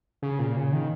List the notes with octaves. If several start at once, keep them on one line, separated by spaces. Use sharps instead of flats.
C#3
A#2
C#3
D#3